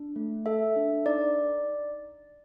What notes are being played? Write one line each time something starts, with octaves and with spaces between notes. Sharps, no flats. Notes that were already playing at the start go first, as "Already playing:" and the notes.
Already playing: D4
A3
A4 E5
D4
D#4 D5